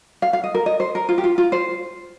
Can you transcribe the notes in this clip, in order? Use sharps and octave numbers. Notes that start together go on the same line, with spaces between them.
F5
F5
D#5
A#4
D#5
C5
A#4
F4
G4
F4
F4
C5